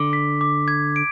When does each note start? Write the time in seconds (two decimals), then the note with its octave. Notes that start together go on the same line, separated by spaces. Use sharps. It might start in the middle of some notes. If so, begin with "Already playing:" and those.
Already playing: D3 D6
0.13 B6
0.41 D6
0.68 G#6
0.96 D7